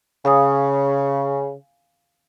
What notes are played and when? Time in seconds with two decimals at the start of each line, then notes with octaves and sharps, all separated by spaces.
0.25 C#3 F5 G#5 D#6